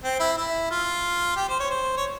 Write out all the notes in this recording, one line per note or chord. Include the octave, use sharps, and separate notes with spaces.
C4
E4
E4
F4
G4
C5
C#5
C5
C#5